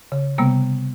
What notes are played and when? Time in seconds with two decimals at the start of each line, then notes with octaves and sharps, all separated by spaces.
0.12 C#3
0.38 C3 G3 A#3 B3